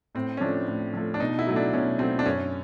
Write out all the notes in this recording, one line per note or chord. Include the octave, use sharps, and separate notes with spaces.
A2 C4
C#4
F3 A3 D4
A2
F3 A3
D4
B2 D#4
E4
F#3 A3
D4
B2 C#4
F#3 A3 C4
D4
F#2 C#4